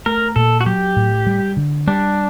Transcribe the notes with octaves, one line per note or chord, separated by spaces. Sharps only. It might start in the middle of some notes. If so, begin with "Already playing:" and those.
A3 A#4
A#2 A4
F#4
F#3 G4
A2
G3
D3
G3 D4